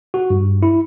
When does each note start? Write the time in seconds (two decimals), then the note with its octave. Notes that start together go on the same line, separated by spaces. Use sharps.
0.14 F#4
0.30 G2
0.63 E4